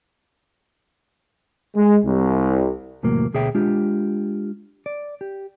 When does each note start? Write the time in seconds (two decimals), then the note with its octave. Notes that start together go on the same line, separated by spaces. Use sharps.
1.75 G#3
2.04 C2
3.03 E2 A2 C3 F#3 A#3
3.34 D2 B2 G#4 C#5 E5 G5
3.55 G#3 D4 F4 G4
4.86 D5
5.21 G4